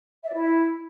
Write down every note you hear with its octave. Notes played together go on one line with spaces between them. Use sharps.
E5
D5
E4